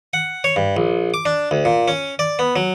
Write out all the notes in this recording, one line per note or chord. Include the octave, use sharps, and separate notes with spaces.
F#5
C#5
G2
A#1
D6
D4
D2
A#2
C#4
D5
B3
F#3